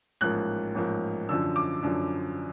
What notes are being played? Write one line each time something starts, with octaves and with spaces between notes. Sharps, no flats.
A1 G#2 F3 A#3 F#6
A1 G#2 F3 A#3
F#2 D3 F3 E6
D6
F#2 D3 F3